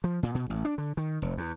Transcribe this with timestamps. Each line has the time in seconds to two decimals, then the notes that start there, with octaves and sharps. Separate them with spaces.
0.04 F3
0.23 A#2
0.35 B2
0.50 A1
0.65 D4
0.78 D3
0.97 D#3
1.22 F1
1.37 E2